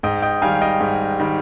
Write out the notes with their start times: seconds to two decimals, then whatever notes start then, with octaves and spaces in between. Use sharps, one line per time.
0.03 G#2 D#5 G5
0.22 D#5 G5
0.42 D#3 G3 F5 G#5
0.61 D#5 G5
0.81 G#2
1.20 D#3 G3